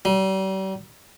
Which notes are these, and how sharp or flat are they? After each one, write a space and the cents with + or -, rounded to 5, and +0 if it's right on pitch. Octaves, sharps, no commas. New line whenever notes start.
G3 -40